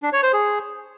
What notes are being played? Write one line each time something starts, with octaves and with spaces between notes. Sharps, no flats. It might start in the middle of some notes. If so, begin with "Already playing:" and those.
D4
C#5
C5
G#4